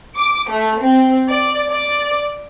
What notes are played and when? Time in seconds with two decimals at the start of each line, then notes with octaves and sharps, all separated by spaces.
0.16 D6
0.51 A3
0.83 C4
1.29 D5
1.72 D5